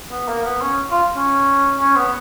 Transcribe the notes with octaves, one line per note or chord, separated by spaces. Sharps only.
B3
A#3
B3
C#4
F4
C#4
C#4
B3